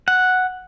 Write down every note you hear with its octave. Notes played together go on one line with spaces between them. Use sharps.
F#5